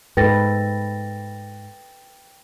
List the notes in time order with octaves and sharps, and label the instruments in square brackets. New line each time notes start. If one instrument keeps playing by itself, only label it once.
[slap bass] G#2 [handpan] A4 B4 [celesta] G5 A6 A#6